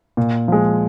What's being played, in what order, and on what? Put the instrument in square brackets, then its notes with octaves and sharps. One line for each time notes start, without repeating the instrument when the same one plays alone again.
[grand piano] A#2
F3 G#3